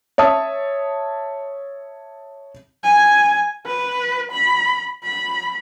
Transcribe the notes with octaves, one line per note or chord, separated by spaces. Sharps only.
C#5 E5 A5 D#6
G#5
B4
B5
B5